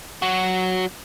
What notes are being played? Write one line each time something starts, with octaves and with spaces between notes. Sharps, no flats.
F#3 F#4